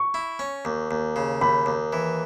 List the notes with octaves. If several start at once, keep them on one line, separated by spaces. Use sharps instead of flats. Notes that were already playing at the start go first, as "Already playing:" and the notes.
Already playing: C#6
E4
C#4
D#2
D#2
C#3
D#2 B5
D#2
E3